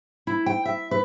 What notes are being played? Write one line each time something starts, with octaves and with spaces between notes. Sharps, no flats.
E4
G5
E5
B4